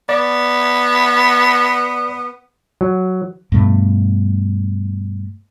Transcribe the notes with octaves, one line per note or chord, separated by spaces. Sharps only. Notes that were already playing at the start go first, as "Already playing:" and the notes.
B3 D5
F#3
G2 B2 A3